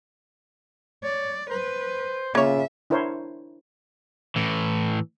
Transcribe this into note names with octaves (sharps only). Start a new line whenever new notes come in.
C#5 D5
B4 C5
C#3 A#3 F4 C#5 E5
D4 E4 A#4 C5 C#5
A2 E3